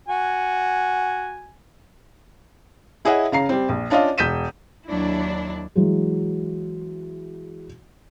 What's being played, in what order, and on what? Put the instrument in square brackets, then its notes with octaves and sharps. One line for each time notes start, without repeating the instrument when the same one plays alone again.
[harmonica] F#4 G#5
[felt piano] E4 G#4 C#5 D#5 E5 F#5
C#3 F5 A#5 C7
G3 C4
A#1
C#4 D4 F4 D#5 F5
E1 G6 B6 D#7 E7
[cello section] D#2 F#3 D4 E4
[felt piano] E3 F#3 G#3